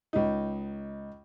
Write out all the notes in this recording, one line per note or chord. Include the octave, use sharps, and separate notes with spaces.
C#2 D#4